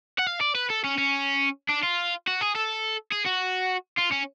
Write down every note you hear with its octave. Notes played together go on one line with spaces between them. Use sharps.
F#5
F5
D5
B4
A4
C#4
C#4
D4
F4
F#4
G#4
A4
G#4
F#4
F4
C#4